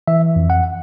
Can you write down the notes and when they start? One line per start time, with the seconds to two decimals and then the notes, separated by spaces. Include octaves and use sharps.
0.07 E3 E5
0.36 F2
0.50 F#5